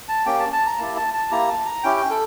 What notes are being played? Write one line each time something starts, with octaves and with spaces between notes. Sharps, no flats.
A5
A#3 C#4 G4 G5
A5
A5
A#5
A#3 E4 G4 A5
A5
A5
A#3 E4 G4 A#5
A5
A#5
C#4 E4 G4 G5
G5
A4